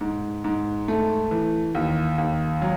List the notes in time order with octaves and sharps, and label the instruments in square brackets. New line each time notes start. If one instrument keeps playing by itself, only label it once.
[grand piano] G#2
G#2
A3
E3
D#2
D#2
F#3